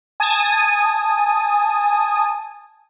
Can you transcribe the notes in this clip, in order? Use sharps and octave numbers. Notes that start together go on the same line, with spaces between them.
G#5 A5 D#6